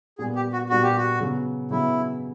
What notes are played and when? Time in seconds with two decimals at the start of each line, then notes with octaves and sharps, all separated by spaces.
0.18 A#2 G3 B3 G#4
0.36 G4
0.53 F#4
0.69 A#2 G3 B3 F#4
0.83 G4
0.96 F#4
1.20 C#3 F#3 B3
1.71 C#3 F#3 B3 E4